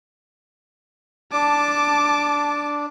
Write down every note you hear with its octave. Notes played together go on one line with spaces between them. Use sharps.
D4 A5 D6